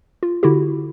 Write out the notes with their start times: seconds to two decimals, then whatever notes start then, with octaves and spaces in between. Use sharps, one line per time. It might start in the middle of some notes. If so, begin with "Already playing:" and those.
0.23 F4
0.43 D3 E4 F#4 G4